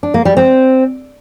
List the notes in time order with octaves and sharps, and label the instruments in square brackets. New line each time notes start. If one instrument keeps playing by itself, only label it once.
[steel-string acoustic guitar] D4
A#3
G3
C4